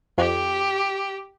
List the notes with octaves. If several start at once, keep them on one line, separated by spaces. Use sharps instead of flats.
F2 G4